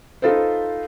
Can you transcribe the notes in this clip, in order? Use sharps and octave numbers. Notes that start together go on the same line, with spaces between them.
D#4 F4 A4 B4 C5